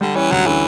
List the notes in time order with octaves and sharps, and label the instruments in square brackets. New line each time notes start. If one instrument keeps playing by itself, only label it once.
[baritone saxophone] D3 [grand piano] G3
[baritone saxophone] E3 [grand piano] C#4
[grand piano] D2 [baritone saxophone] F#3
[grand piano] D3 [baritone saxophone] E3